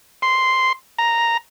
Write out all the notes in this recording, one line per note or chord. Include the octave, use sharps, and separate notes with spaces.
C6
A#5